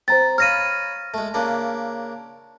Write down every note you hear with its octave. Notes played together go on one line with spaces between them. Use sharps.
C4 C5 A#5 A6
C#5 F5 B5 F6 A#6 D#7
G#3 A3
C#3 A#3 D4